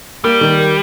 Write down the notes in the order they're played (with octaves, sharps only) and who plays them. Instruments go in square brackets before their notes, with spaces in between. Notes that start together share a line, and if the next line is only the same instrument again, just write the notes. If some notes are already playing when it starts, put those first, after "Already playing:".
[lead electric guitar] G3 [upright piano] A#3
[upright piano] D#3